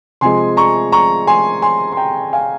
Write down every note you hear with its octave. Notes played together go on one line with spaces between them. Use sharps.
C3 F3 G#3 G#5 C6
A#5 C#6
A#5 C#6
G#5 C6
G#5 C6
C6
G5 A#5
F5 G#5